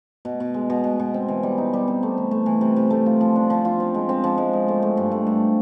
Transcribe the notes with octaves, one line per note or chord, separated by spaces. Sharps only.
B2
B2
G#3
B2
B2
B2
C4
E3
G3
D#4
G3
C4
A3
E3
A3
E3
C3
C3
A3
F4
F3
D4
F3
F4
C4
G#3
C4
F3
G#3
G#3
A3
A3
G2
A3
G2